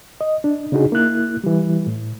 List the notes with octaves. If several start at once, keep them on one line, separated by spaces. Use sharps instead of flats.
D#5
D4
C#3 D4 D#4 F#4 G#4
A#3 E4 F#6
E3 G3
A2